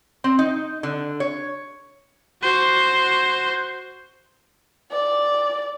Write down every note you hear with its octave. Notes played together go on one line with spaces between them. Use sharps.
C4
D#4
D3
C#5
F#4 C5
D5